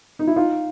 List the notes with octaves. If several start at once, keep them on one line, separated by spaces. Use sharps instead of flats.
D#4
E4
D#4 F4